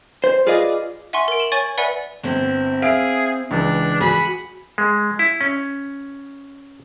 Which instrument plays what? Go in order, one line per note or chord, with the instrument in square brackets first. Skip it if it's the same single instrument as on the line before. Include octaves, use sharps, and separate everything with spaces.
[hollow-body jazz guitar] C5
F4 G#4 B4 D5 D#5 F5
[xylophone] E5 F#5 G#5 C6 C#6
A#4 D7
E7 F#7
C#5 G#5 C#6 A6
B4 D5 E5 F#5 G#5 B5
[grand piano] G1 [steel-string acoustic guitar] C4 E4
[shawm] G#4 [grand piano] E5 F5 D7
[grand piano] C#2 E3 [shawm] D4
[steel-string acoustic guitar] F#4 G#4 [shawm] B5
[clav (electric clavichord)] G#3
E4
C#4